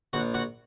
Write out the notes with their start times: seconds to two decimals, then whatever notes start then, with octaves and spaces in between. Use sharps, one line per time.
0.13 A#1 F#4
0.34 F#4